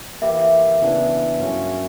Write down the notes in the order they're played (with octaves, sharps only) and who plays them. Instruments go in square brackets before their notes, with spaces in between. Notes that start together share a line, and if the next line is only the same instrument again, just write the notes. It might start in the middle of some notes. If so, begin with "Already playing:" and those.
[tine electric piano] E3 A#3 E4 G4 [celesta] E5
[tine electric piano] C#3 E3 B3 D4
G2 F#3 A#3 C#4 F#4